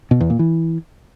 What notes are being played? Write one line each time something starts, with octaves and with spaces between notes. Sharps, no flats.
B2
E2
A#2
E3